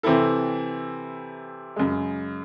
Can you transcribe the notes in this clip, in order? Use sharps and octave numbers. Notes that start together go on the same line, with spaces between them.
C3 E3 C4 E4 A4
F#2 C#3 G#3